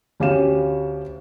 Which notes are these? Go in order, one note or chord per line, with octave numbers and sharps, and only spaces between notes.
D2 C#4 G4 F5 E7